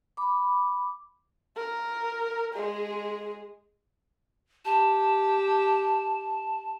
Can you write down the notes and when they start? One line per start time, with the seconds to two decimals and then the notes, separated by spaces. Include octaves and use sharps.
0.17 B5 D6
1.56 A#4
2.53 G#3 G#4
4.65 G4 A5